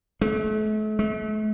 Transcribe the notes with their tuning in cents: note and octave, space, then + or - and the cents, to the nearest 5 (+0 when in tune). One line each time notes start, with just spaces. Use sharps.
A3 -40
A3 -40